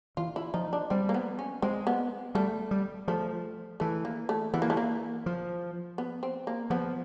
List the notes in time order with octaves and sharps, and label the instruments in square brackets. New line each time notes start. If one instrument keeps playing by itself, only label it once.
[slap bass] E3 [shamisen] F4
[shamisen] E4
[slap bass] F3 [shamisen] D#4
[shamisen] D4
[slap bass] G3 [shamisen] C4
[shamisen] A#3
B3
C#4
[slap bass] G#3 [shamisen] C4
[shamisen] B3
[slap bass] G3 [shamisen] A3
[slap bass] G3
[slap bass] F3 [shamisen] A3
[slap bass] E3 [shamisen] A3
[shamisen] A#3
A3
[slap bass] E3 [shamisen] B3
[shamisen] A#3
A3
A#3
[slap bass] F3
[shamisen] B3
C4
A#3
[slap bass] F3 [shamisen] B3